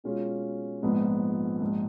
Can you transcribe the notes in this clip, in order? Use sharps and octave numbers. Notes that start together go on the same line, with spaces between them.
B2 G#3 C#4 F4 G#4
A#1 G#2 F3 G#3 B3
A#1 G#2 F3